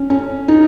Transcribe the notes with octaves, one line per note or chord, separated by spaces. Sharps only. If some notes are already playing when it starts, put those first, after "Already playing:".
Already playing: C#4
C#4
D#4